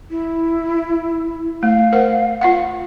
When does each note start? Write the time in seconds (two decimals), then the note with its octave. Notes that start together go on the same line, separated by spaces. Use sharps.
0.11 E4
1.63 A3 F5
1.93 A#4 C5 F#5
2.41 F4 F5 F#5